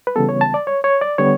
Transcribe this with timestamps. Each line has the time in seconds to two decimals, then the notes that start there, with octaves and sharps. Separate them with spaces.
0.07 B4
0.16 C#3 E3 G3 B3 A4
0.29 C#5
0.41 A5
0.54 D5
0.67 C#5
0.84 C#5
1.01 D5
1.18 D3 G3 B3 C#5